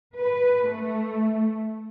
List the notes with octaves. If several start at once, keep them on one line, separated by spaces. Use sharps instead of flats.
B4
A3